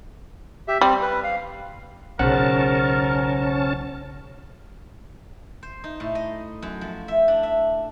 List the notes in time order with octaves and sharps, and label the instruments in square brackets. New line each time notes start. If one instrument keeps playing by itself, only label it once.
[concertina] G4 E5
[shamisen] G3 [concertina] C4
[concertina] B4
F5
[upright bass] B1 [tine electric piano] C#3 C5 F#5 [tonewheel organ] C#4 A5 [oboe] A#4
[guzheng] C5
D#4
A2
D#5
F#2
F3
E5
D4
E5